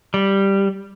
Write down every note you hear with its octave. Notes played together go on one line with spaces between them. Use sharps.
G3